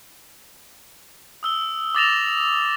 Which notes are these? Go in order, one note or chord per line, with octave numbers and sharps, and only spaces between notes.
D#6 E6 G7
D6 D#6 A6 A#6 E7 F7